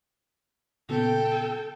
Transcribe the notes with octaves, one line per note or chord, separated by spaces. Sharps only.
A#2 C#3 B3 A4 G5